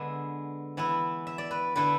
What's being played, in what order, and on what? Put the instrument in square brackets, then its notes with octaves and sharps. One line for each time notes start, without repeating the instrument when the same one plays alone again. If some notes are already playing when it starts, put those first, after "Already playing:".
Already playing: [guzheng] D3 G#3 B3 E5
E3 B3 E4
E5
D5
B4
D3 A3 E4 B4